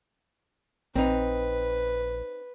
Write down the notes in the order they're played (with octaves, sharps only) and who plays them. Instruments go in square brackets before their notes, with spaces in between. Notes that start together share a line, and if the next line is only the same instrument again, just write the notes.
[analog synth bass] A#1 [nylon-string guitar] C4 D#4 [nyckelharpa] B4